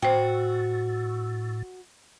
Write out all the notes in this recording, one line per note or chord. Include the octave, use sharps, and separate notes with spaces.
A2 F#4 C5 G5